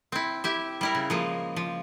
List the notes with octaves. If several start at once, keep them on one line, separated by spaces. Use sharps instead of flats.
C4 E4
E4 G4 E5
G3 E4 A#4
C#3
F3 G#3 A#3
F3